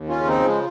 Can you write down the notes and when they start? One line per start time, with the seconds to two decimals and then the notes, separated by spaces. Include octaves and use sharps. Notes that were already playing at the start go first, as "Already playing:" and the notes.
Already playing: D#2
0.09 C#4 F4
0.15 C#3
0.27 C4 D#4
0.39 F3
0.46 G#3